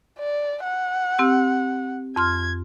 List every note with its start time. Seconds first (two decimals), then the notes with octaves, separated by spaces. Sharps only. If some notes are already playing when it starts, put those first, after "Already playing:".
0.19 D5
0.63 F#5
1.18 C4 G4 E6
2.16 F2 C6 F6 G#6